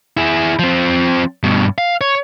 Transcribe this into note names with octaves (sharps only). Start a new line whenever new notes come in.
E4 G#4
F3 C4
G2 B2
F5
C#5